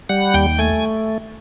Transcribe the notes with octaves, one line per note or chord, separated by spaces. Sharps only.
G3 F#5
D#2 G5
A3 G#5